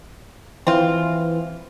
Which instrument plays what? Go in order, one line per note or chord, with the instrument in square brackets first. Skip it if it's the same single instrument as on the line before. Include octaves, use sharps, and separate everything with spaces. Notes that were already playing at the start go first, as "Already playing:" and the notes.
[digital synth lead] E3 [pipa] C4 F4